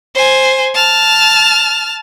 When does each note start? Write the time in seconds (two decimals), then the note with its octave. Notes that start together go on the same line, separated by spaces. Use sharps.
0.15 C5 G#5
0.74 A5 F6